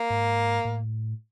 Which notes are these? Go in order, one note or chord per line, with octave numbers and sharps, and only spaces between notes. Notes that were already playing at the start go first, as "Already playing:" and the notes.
Already playing: A#3
G#2
A2